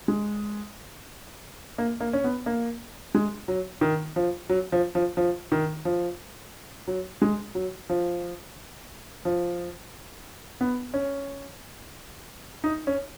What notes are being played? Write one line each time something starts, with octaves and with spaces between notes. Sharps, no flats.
G#3
A#3
A#3
C#4
B3
A#3
G#3
F#3
D#3
F3
F#3
F3
F3
F3
D#3
F3
F#3
G#3
F#3
F3
F3
B3
C#4
D#4
C#4